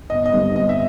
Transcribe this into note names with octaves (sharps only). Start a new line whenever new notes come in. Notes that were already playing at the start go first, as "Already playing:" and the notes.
G1 D#5
D#5
G2 D3 G3 C4
G1 D#5
E5